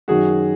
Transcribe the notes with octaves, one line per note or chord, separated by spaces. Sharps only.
F#2 D#3 F#3 F#4 G#4